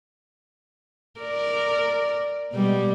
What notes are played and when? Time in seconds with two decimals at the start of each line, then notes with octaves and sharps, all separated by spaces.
1.20 A#4 D5
2.53 B2 G3 G#3